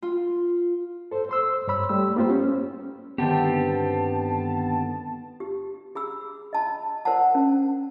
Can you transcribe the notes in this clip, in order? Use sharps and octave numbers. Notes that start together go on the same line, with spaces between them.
F4
A4 C5
C5 C6 E6
G2 C#5 B5 E6
G3 A3 E6
A#3 B3 F4 G4 C5
C#4
G2 D3 D#3 B3 C4 G4 A5
G4
G#4 B5 E6
D#5 A5 B5
A#4 C5 D5 F#5 A5
C#4